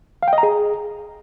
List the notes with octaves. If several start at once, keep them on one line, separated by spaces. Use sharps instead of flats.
F5
G5
D#5
A#5
G#4